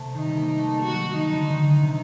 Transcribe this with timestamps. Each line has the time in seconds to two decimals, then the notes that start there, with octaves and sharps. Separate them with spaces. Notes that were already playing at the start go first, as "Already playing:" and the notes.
Already playing: C3 A3
0.14 D#3 D#4
0.26 G3
0.37 A#3
0.49 A#3
0.59 A3
0.82 F#4
0.93 F#3
1.04 F#3
1.15 D#3 D#4
1.32 D3
1.50 D#3
1.83 C3